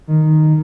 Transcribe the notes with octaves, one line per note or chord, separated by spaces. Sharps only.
D#3